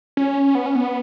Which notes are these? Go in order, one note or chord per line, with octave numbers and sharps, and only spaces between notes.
C#4
B3
C#4
B3